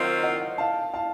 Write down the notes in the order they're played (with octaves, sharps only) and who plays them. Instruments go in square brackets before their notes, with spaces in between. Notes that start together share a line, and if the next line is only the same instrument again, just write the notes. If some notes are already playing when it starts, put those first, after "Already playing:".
Already playing: [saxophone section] D#3 F#3 C4 F4 [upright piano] C5 D#5
[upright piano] D#5 F#5
F5 A5
F5 A5